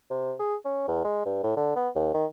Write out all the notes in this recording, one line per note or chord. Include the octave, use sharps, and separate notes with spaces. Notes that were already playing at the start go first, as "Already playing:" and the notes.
C3
G#4
C#4
E2
G#3
G2
A2
D3
B3
D#2
D#3